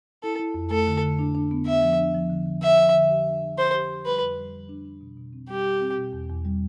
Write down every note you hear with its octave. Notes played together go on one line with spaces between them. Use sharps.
E4 A4
E4
F2
A3 A4
D3
D3
D4
D4
B3
B3 E5
F3
D4
F3
D3
D3
B3 E5
F3
D3
G4
D4
D4
G4 C5
G4
G4
G3 B4
F2
G3
G3
D4
D4
B2
B2
C4
G3 G4
G3
C4
B2
E2
E2
G3